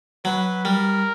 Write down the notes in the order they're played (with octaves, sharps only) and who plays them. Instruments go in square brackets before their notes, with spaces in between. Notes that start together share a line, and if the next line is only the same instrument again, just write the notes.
[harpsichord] F#3 [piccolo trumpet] B4
[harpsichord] G3 [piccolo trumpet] A#4